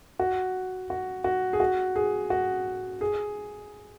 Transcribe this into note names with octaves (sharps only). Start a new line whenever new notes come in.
F#4
F#4
F#4
G#4
F#4
G#4
F#4
G#4